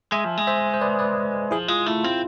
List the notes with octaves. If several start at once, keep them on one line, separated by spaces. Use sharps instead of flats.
G#3 E5 G#5
F3
G#3
C5 E5
C5
B4 D5
B4 D5
F3 E4 G#4
G#3 F4
A3 E4
C4 F4